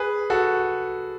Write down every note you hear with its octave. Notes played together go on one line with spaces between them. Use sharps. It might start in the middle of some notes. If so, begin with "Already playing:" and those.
Already playing: G#4 B4
F#4 A4